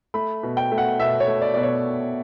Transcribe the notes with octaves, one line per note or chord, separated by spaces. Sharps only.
A3 B5
B2
G5
A3
F#5
B2 E5
C#5
A3
D5
B2 D5
C#5